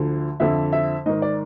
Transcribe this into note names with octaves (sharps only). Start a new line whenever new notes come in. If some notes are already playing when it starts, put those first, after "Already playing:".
Already playing: D2 D3 F3
F2 D3 F3 E5
E5
G#2 D#3 D#5
D5